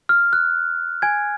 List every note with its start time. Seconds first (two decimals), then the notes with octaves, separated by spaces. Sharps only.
0.09 F6
0.33 F#6
1.02 G#5 G#6